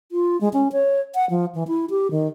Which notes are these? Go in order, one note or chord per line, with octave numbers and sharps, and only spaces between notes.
F4
G#3
C#4
C#5
F#5
F3
E3
E4
G4
D#3